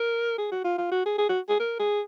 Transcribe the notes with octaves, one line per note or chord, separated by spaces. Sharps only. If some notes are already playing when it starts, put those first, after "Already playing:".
Already playing: A#4
G#4
F#4
F4
F4
F#4
G#4
G#4
F#4
G#4
A#4
G#4